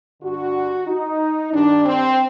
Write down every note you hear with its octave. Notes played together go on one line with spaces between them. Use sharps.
G2 D3 F#4
D#4
G2 D#3 D4
C4